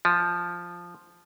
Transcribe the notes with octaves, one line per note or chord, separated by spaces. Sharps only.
F3